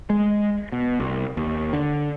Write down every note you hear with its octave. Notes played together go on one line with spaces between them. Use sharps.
G#3
B2
C2
D#2
D3